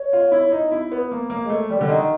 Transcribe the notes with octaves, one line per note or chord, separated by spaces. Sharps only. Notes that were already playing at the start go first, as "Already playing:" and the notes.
Already playing: C#5
F4
E4
D#4
E4
B3
A#3
A#3
G#3
A3
G3 D5
D3
D#3 D#5